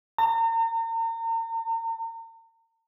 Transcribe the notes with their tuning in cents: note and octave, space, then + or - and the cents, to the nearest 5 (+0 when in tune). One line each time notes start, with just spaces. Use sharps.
A#5 -40